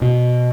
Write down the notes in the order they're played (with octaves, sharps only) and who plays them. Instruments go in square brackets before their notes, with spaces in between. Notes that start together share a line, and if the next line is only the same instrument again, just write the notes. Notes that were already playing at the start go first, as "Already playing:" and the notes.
[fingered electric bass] B2